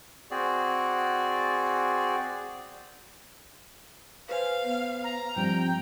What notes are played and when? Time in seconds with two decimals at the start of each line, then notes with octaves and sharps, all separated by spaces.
0.31 C4 F#4 G#4 D5
4.29 B4 C5 F5 G#5
4.64 B3
5.04 A#5
5.36 G2 F3 G3 C4 G5